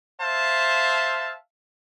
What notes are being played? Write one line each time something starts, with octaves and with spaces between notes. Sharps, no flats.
C5 E5 F5 A5